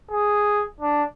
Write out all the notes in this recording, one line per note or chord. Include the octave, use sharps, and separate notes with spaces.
G#4
D4